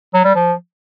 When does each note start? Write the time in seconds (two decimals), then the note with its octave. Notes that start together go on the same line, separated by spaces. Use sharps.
0.14 F#3
0.24 G3
0.35 F3